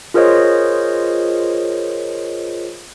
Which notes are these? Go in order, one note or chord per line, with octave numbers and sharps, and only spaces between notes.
F4 G#4 A#4 C5 C#5 D#5